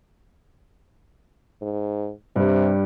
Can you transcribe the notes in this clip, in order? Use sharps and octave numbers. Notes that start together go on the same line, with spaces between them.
G#2
G2 C3 G3